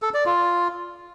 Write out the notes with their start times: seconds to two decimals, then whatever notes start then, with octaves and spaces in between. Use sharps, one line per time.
0.02 A4
0.14 D5
0.26 F4